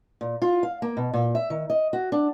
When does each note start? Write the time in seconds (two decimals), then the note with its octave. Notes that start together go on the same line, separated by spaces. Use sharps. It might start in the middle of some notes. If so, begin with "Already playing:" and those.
0.21 A#2
0.42 F4
0.63 F5
0.82 A#3
0.97 B2
1.14 A#2
1.35 E5
1.50 D#3
1.70 D#5
1.93 F#4
2.12 D4